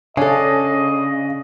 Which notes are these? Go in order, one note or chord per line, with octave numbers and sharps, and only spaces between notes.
C#3 C#4 D4 A4 D#5